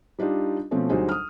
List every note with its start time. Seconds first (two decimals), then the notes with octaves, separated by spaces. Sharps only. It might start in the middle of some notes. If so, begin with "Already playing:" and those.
0.19 G3 D4 D#4 F4 G4
0.71 B2 F3 A3 C4 C#4
0.89 D2 F#3 G3 D#4 G#4 C5
1.09 D#6 F6